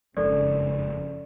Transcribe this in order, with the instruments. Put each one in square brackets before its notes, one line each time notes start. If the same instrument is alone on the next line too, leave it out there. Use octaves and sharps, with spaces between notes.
[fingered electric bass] F#1 F2 G#2 [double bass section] C#3 [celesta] A4 D5